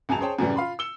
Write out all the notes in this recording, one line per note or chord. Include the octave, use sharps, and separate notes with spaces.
C#2 F#2 G#5 A5 F7
G#4 C5 C#5 G5 A5
F#2 A2 C#3 E3 G3
F4 F5 B5 C6
E6 C#7 E7 G7